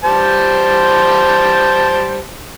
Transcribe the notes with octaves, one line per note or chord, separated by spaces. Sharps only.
G3 C5 A5